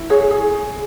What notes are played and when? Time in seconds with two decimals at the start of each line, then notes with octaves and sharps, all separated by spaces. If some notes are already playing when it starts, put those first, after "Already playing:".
Already playing: E4
0.10 G#4 C#5
0.31 G#4